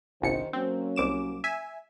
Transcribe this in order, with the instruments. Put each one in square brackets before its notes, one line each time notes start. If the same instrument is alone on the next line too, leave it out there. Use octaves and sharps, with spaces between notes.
[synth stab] G1 C2 C#7 [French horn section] D#3 C5
[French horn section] F#3 A#3 C#4 [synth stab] C4
[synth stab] C2 D6 E7
E5 G#5